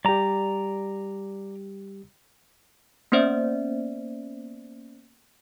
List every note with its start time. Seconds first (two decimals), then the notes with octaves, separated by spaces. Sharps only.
0.05 G3 G4 D5 A#5
3.12 A#3 B3 C#4 C5 D5 E5